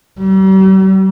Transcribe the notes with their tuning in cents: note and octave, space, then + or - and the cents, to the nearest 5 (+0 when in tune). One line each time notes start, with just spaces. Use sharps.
G3 -45